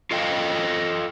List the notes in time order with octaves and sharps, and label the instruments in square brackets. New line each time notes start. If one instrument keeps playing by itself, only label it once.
[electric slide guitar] F4 A4 D#5 F5 G5